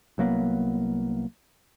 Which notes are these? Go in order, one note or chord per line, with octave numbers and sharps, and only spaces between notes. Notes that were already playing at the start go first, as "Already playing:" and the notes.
C2 F#3 A#3 B3